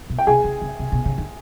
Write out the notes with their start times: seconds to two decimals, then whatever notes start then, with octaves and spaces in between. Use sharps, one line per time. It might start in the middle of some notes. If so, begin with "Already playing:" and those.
0.10 B2
0.19 G5
0.27 C3 G#4 G#5
0.44 C#3
0.62 C#3
0.79 C3
0.92 B2
1.05 C#3
1.18 D#3